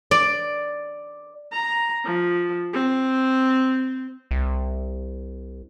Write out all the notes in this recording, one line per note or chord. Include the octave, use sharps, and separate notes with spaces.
D5
A#5
F3
C4
C2